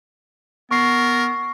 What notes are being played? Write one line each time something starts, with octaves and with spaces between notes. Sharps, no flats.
B3 A#4 C#6 C7